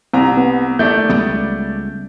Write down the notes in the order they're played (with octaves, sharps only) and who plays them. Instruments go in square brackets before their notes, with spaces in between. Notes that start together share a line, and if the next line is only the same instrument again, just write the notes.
[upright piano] C2 A#5 [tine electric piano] C4
[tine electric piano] B3
[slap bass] D#2 [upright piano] A3 D5 [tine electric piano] G6
[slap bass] C#2 G3 B3